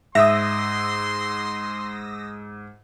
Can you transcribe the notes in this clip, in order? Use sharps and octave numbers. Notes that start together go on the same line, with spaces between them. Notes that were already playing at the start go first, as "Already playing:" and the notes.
G#2 E5 C6 D#6 E6 A#6